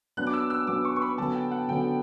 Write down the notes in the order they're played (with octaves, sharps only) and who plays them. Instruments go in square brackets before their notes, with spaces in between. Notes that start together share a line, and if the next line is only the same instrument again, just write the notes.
[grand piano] F#3 B3 D4 [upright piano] F#6
[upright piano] D6
E6
E6
[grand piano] F#3 B3 D4 [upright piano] D6
[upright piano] C#6
C#6
B5
[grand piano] D3 F#3 B3 [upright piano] A5
[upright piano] G5
F#5
[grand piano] D3 F#3 B3 [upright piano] G5